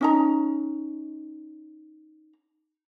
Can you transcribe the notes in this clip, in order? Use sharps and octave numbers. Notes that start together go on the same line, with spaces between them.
C#4 D#4 A#5